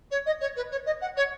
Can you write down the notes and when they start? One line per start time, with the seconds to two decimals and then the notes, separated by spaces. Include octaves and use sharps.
0.10 C#5
0.26 D#5
0.40 C#5
0.56 B4
0.71 C#5
0.86 D#5
1.00 F#5
1.16 C#5